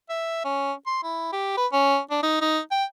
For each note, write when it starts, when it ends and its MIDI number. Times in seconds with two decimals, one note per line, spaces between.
0.10 0.41 76
0.45 0.73 61
0.87 1.01 84
1.03 1.32 64
1.32 1.53 67
1.57 1.67 71
1.73 1.99 61
2.11 2.22 62
2.23 2.39 63
2.41 2.60 63
2.71 2.84 79